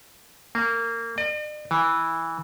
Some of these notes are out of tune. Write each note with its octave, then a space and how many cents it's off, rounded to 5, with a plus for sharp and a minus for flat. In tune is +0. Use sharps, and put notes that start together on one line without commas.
A#3 -20
D5 +45
E3 -10